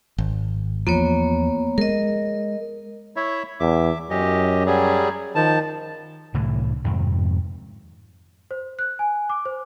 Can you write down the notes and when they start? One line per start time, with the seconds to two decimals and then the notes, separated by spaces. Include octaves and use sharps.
0.18 G#1
0.87 E2 F3 A#3 B3 C#5
1.78 G#3 A#4 D#5
3.16 E4 C#5 E5
3.60 E2 E5 D6
4.10 F#2 C#4 G4 D#5
4.66 F#3 G3 G#4
5.35 D#3 F3 A5
6.34 C2 A2 D3 E3
6.85 F2 G#2 C3 D#3
8.51 C5
8.79 F#6
8.99 G#5
9.30 D6
9.45 C5